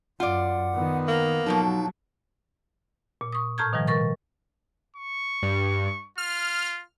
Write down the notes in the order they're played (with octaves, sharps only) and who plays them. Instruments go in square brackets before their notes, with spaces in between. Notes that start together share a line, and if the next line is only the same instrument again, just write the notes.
[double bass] F#2 [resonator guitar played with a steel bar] F4 D5 [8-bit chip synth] F#5
[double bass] D#3 B3
[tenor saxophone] A#3
[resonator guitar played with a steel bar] B2 F3 A4 [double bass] F#3 [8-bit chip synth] D#4
[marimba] A#2
C#6 D#6
A2 A5 A#5 F6 G6 G#6
B2 D#3 F3 G3
A#4 C#6 A6
[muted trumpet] C#6
[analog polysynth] G2
[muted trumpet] F4 [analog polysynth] F6